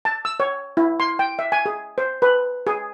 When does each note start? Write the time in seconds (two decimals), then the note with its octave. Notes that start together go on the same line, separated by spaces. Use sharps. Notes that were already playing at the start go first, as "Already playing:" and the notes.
0.05 A5
0.25 E6
0.40 C#5
0.77 E4
1.00 C6
1.19 G5
1.39 E5
1.52 G#5
1.66 G#4
1.98 C5
2.22 B4
2.67 G#4